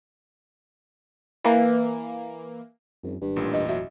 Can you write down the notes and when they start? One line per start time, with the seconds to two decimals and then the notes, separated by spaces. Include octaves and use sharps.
1.45 E3 A#3
3.03 G#1 F#2
3.21 G#1 G2
3.36 A1 A#2
3.54 E1 D#5
3.69 F#3 E5